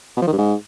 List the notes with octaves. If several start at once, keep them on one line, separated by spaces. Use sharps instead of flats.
B2
F3
D#3
G2
G#2